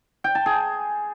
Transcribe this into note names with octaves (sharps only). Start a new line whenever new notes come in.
G5
A5
G#4